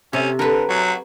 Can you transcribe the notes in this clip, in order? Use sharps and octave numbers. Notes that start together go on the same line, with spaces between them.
C3 C#4
D3 A#4 B4
F#3